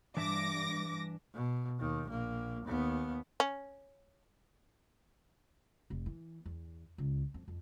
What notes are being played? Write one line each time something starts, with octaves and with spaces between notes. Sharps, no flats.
G2 E3 D4 E5 D6 A#6
B2
D#2 D#3
A#1 A#3
D#2 B3
C#4
F1
E3
E2
C#2
F2
F2